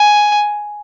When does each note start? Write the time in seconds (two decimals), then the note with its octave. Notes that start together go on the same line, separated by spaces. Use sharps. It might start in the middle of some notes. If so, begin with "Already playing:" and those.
Already playing: G#5